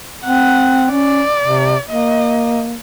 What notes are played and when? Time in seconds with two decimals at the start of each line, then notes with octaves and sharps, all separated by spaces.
0.25 C4 F#5
0.91 C#4 D5
1.41 C3
1.90 A#3 D#5